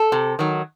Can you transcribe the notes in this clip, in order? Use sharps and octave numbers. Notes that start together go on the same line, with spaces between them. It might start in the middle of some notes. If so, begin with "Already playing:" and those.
Already playing: A4
C3
D#3 F#3